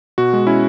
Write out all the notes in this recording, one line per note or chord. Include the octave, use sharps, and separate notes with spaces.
B2 F#4
G#3
C#4 E4